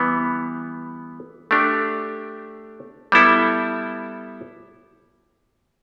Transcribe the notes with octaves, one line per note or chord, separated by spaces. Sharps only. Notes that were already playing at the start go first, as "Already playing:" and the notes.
Already playing: E3 G3 B3
A3 D4 G4
G3 B3 E4 A4